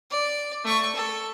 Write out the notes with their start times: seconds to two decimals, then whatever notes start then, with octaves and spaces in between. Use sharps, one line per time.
0.11 D5
0.64 A3 C#6
0.95 A4